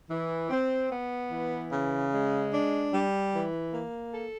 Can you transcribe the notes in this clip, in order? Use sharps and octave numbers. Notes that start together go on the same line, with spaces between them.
E3
C4
B3
E3
C#3
G#3
D4
G3
E3
A#3
A4